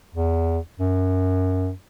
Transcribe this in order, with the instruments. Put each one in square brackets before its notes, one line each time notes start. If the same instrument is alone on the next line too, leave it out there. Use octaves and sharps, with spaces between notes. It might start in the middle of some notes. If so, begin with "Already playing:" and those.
[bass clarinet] E2
F#2